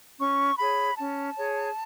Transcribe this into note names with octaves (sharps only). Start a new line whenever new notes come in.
C#4 C#6
G#4 C#5 B5
C#4 A5
G#4 C#5